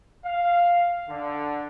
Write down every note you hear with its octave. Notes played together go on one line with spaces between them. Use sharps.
F5
D3